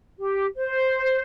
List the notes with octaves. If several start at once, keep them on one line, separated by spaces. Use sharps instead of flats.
G4
C5